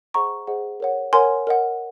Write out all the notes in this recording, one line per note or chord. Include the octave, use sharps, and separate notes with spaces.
G#4 C5 D#5 F#5 A#5 C#6
G#4 C5 D#5 F#5
A#4 C#5 F#5
A#4 C#5 F#5 G#5 C6
A#4 D#5 F#5